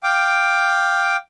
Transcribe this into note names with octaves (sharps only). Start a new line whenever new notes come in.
F5 G5 D6